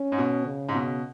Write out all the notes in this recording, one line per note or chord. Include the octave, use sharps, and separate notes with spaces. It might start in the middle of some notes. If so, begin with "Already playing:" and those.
Already playing: C#4
G#2
B2
C#3
G#2
B2